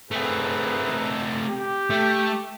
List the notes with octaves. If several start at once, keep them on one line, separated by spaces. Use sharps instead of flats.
A3 C4 G#4 A#4 B4
G4
A3